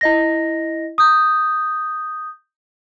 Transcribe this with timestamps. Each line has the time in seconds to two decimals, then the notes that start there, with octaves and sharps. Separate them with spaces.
0.01 E4 D#5 A#6
0.98 D#6 G6